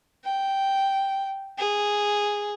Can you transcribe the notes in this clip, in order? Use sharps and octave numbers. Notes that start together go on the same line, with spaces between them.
G5
G#4